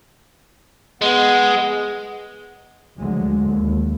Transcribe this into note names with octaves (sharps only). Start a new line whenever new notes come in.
G#3 B3
D2 D3 F3 F#3 G#3
D#2